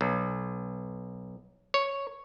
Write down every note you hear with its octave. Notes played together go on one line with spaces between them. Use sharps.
B1
C#5